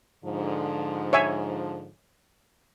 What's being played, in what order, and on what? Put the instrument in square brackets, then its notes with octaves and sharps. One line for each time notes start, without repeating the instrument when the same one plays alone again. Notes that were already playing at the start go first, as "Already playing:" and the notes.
[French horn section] G#2 D3 F3
[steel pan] C#5 E5 G#5